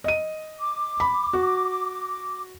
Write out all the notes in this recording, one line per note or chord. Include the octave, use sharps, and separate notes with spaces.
D#5 D#7
D6
B5
F#4